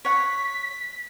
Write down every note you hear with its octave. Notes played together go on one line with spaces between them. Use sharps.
C#5 F#5 B6